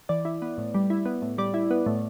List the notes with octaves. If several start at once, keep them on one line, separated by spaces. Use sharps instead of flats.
E3 D5
E4
B3
A2
G3
E4
B3
A2
G3 D5
E4
B3
A2